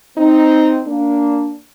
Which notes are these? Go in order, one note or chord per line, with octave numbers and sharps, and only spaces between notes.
C4 D#4
A#3 D4